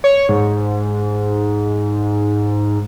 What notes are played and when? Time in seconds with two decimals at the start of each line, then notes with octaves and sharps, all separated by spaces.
0.04 C#5
0.29 G#2